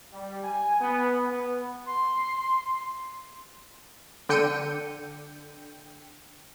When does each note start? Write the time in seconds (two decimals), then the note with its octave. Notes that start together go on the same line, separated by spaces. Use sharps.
0.12 G3
0.42 G#5
0.80 B3
1.26 B3
1.87 C6
4.29 D3 G5 C#7 D#7